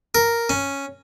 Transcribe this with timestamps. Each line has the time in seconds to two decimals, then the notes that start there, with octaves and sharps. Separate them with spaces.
0.15 A#4
0.50 C#4